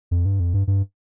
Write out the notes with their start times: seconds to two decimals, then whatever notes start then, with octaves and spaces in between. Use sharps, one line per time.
0.11 F2
0.26 G2
0.40 F2
0.54 G2
0.67 G2